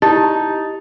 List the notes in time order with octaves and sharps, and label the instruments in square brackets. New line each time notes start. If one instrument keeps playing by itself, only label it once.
[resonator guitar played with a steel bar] D#4 [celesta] E4 A6 [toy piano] G4 [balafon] A5